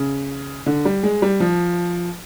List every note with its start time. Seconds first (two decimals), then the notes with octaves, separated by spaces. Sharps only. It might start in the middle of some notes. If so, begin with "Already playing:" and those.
Already playing: C#3
0.66 D3
0.85 G3
1.03 G#3
1.22 G3
1.40 F3